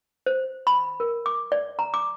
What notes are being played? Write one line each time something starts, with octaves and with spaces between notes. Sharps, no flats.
C5
B5
A#4
D6
D5
A#5
D6